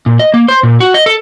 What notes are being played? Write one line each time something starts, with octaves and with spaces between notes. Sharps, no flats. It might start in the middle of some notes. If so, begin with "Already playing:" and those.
A#2
D#5
A#3
C5
A#2
F#4
D#5
A4